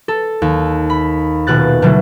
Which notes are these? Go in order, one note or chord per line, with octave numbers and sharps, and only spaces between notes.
A4
D#2
B5
D#1 B2 F#6 A6
B2 D3 F#3 A3